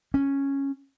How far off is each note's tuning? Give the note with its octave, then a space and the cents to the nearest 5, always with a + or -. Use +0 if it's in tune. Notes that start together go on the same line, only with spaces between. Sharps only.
C#4 -5